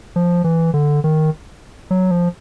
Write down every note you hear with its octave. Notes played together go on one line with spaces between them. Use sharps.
F3
E3
D3
D#3
F#3
F3